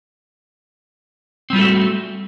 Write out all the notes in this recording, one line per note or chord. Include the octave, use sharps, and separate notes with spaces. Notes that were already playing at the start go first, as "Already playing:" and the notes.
G3 A3 C4 F4 F#4